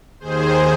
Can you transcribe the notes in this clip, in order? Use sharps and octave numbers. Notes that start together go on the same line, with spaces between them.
D#2 D#3 G#4 C5